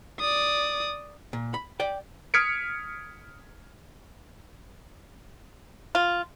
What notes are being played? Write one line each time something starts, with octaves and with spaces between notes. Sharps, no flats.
D5 D#6
A#2
B5
D5 G5
D#6 F6 G#6 B6 C#7 D7
F4